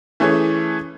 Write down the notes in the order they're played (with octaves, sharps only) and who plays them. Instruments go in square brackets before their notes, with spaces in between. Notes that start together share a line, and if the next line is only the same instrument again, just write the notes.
[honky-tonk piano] E3 A3 C#4 G#4 C#5